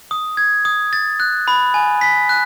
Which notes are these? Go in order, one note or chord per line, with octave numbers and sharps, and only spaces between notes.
D#6
G#6
D#6
A6
F#6
B5
G#5
B6
F#6